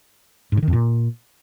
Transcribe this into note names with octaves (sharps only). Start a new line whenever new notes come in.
G#2
C#3
D#3
F2
A#2